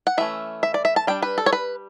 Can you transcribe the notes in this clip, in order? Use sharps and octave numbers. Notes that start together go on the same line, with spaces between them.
F#5
E3 A3 C#4 E5
E5
D5
E5
A5
G3 D4 G5
B4
A4
C#5
B4